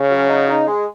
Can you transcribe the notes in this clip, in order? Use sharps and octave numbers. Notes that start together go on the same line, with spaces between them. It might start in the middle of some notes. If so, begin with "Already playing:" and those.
Already playing: C#3 C#4
F#3
D#4
D#4
G#3